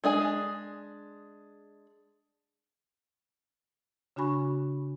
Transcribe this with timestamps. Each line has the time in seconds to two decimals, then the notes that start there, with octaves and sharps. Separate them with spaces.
0.04 G#3 D4 G#4 G#5
4.16 C#3 D4 F#4 G#5 B5 C#6